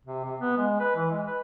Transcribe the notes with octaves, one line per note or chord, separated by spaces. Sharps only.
C3
C3
B3
G#3
B4
E3
G#3
B4